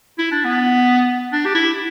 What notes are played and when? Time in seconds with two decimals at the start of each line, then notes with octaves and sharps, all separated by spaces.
0.18 E4
0.31 D4
0.45 B3
1.32 D4
1.45 G4
1.55 E4